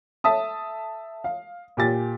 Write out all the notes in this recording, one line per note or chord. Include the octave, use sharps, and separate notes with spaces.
A4 E5 A5 D#6
F5
A#2 G4 G#5 A6